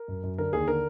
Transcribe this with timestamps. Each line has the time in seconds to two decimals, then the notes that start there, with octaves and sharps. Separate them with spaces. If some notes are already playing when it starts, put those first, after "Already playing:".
Already playing: A#4
0.08 F#2
0.23 F#2
0.38 D3 A#4
0.53 D#2 G#4
0.68 D3 A#4